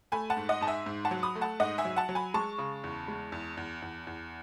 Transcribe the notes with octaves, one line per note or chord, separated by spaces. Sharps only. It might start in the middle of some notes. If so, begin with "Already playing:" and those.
A3 G#5 B5
F#5 A5
G#2
D#5 F#5
G#2 A5
E5 G#5
G#2
F#5 A5
F#3
B5 D#6
A3
F#5 A5
G#2 D#5 F#5
E5 G#5
F#3
F#5 A5
F#3
G#5 B5
G#3 A5 C#6
C#3
E2
G#3
E2
E2
E2
E2